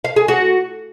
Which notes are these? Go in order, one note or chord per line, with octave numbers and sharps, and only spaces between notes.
F5
G#4
F#4